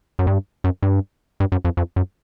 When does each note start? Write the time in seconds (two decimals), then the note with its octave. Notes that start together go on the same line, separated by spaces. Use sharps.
0.19 F#2
0.27 G2
0.64 F#2
0.83 G2
1.40 G2
1.52 F#2
1.65 F2
1.77 F2
1.96 F#2